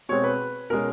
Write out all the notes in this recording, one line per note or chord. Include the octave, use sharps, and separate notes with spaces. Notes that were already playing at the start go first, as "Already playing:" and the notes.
B2 G#3 C4 C#5
B4
B2 G#3 C#4 A#4